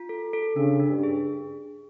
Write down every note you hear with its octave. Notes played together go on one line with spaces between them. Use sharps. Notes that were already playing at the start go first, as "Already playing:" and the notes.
Already playing: F4
A4
A4
C#3 D4
D4
G2
G#4